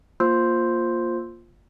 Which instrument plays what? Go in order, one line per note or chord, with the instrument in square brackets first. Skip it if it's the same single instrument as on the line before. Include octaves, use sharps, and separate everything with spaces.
[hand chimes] A#3 F4 C5 C6 E6 G6